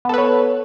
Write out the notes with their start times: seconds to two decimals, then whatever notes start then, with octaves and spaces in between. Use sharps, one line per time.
0.05 B3
0.09 A4
0.14 B4
0.18 C#5